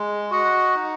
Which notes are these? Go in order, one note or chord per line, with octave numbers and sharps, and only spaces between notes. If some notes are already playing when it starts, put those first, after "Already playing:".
Already playing: G#3
F#4 D#5 F#5
D#4